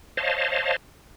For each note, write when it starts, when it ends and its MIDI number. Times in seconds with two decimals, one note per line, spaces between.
0.17 0.76 72
0.17 0.76 73
0.17 0.76 75
0.17 0.76 77
0.17 0.76 81